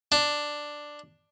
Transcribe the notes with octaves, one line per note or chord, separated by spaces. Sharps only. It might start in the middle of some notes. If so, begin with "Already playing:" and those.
D4